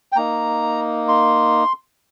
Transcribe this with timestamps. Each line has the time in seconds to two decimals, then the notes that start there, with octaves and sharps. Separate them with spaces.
0.12 G5
0.16 A#3 D#4 A#5
1.08 C6